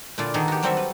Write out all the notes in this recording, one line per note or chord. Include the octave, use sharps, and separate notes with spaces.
A#2 D3 E4 F4 D5
D#3 A#3 B3 G#4 A4
F#4 G4
F#3 G3 C4 F#4 A4 E5
B4